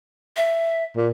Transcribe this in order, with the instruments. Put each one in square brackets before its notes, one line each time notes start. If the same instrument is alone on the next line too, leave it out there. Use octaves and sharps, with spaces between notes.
[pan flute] E5
[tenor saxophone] A#2